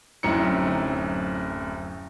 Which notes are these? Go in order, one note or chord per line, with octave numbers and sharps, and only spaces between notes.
D1 F#2 C4 D#4 E4 C#7